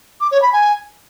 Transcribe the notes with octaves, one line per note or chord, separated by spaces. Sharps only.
D6
C#5
B5
G#5